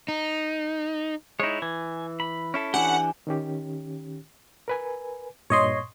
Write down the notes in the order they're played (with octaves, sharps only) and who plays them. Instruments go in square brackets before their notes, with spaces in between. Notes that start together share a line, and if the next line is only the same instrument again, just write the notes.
[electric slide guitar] D#4
[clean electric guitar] G#3 D#4 [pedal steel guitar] E4 C#5
[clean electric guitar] E3 [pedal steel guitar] G#5
[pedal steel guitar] B5
[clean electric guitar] C#4 E4 A4
[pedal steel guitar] E3 D4 G4 [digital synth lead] F#5 [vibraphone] G#5
[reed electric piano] D#3 C#4 G4
A#4 B4 G#5
[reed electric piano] G2 A#2 [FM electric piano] C#5 D#5 C6